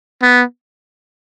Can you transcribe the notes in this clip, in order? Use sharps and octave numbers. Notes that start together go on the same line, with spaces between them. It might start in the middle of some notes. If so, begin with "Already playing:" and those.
B3